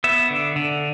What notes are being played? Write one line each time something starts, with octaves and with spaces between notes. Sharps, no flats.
B3 E5
D3
D3